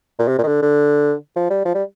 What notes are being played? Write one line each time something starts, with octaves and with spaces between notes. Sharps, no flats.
A#2
C3
A#2
D#3
D3
D3
F3
G3
F3
G3